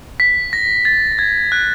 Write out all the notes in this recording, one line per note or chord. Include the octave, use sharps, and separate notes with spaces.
B6
A#6
A6
G#6
F#6